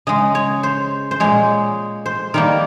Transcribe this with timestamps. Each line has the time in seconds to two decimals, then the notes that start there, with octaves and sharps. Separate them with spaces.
0.07 C#3 G#3 D#5
0.35 C#5
0.63 C5
1.11 C5
1.20 A#2 G#3 C#5
2.06 C5
2.34 D#3 G3 A#3 A#4